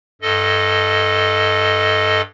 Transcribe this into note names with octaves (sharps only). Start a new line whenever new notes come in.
G2 A4 D#5